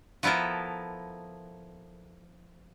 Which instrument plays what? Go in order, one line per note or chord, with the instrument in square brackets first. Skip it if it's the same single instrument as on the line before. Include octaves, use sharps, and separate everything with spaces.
[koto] F3 B3 E4 A4 A#4